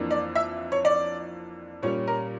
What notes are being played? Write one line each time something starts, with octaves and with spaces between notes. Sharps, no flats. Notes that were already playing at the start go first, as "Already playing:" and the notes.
Already playing: F2 E3 A#3 D4
D5
E5
C#5
D5
A#2 G3 C#4 C#5
A#4